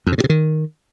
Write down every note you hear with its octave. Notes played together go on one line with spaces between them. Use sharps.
F2
C3
A2
C3
D#3